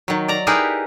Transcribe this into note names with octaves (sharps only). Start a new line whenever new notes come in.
D#3 F#3
D5 A#5
D#4 E4 G4 G#4 A#4 B4